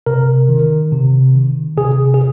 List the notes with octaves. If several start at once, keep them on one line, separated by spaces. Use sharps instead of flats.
C3 A#4
D#3
C3
D#3
C3 G#4
G#4